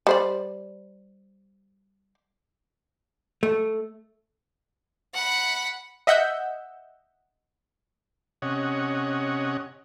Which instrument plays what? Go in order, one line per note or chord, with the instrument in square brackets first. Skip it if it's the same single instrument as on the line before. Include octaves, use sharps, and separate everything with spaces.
[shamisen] G3 C5 D5
[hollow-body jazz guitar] A3
[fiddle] F#5 B5
[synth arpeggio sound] D#5 E5 F#5 E6 G6
[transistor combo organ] C3 C#4 C#5 D#5 F#5